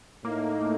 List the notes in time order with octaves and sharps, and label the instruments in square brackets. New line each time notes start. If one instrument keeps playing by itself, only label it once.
[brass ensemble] A2 A3 D#4 [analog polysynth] A#3